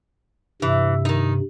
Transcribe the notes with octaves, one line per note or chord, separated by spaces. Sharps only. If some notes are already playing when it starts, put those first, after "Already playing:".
G2 C3 E3
D#3 D#4